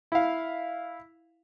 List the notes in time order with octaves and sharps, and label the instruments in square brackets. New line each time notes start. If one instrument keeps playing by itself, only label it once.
[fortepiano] E4 F5